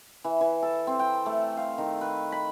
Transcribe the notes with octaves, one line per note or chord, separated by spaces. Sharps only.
E3
E3
A4
C4
G5
A3
F5
D#3
B4
B5